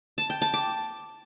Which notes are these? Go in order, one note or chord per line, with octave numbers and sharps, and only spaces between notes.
A5
G5
A5
D6